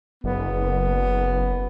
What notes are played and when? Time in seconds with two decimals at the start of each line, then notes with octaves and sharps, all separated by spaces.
0.24 F#1 B3